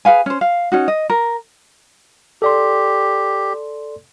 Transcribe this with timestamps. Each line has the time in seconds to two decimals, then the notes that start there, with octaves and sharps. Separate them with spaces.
0.05 G#4 B4 F5 G#5
0.26 C#4 C5
0.41 F5
0.72 C#4 D#4 F#4
0.88 D#5
1.10 A#4
2.42 G4 A4 D5 C6